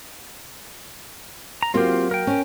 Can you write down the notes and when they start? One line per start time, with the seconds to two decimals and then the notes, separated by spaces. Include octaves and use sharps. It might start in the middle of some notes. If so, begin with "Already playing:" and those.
1.63 A#5
1.74 F#3 A#3 C4 F4 G4
2.11 A#4 G5
2.27 C#4